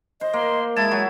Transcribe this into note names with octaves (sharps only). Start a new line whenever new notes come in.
C5 D#5
A#3 C6
G#3 E4 A5 G#6
F#3